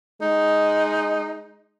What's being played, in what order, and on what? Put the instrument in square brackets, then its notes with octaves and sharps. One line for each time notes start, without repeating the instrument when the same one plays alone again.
[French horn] G#3 [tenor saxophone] D#4